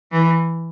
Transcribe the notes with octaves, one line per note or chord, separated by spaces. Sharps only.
E3